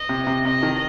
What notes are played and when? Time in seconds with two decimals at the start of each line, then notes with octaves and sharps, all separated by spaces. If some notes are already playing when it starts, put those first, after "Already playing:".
Already playing: D#5
0.09 C3
0.27 C3
0.45 C3 D#5
0.63 D#3